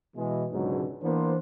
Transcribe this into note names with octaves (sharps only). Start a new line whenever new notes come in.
B2 E3 G#3
C#2 G#2 B2 D3 F#3
E3 A#3 B3 D4 C5